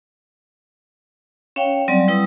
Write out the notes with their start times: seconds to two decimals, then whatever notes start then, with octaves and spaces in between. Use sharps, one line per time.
1.56 C#4 C#5 F5 G5
1.88 F#3 G3 C4 D5
2.08 G3 E4 B4 D#6